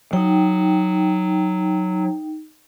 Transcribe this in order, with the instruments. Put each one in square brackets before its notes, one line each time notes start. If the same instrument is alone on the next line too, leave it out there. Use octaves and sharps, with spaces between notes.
[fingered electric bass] F#3 [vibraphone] D#4 G5